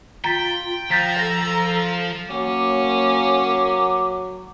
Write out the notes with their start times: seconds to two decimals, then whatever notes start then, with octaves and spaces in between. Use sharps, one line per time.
0.24 F4 G5 A#5 A6 B6
0.91 F3 G5 A#5 G6 A6 B6
1.19 A4 A#6
2.30 F#3 A#3 C#4 D6